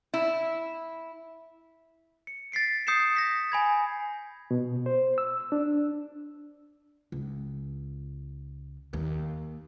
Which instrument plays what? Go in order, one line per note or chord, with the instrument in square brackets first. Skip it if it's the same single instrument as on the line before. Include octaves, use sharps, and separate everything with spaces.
[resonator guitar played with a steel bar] E4
[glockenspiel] C#7
A6 B6 C7 D7
D#6 G6 C7 C#7 E7
G6 A#6 B6
G#5 B5 G#6
[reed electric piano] B2
C5
E6
D4
[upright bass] C#2
D#2